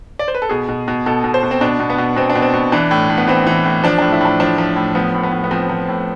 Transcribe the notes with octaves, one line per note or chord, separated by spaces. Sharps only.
D5
C5
B4
A4
B2 G#4
B2
B2
B2 A4
B2
C5
B2
C4
B2 D4
B2
B3
B2
B2 C4
D4
B2
C4
B2
E3 D4
A2
A2
B3
E3 C4
E3
A2
F3 D4
A2 D4
E4
A2 D4
F3 D4
F3
A2
F3 B3
A2
B3
A2
B3
F3 C4
F3
A2